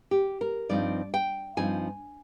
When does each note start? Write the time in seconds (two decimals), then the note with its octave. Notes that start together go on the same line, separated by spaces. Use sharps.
0.11 G4
0.41 A#4
0.69 G2 F3 C4 D#4 D5
1.14 G5
1.57 G2 F3 C4 D#4 G#5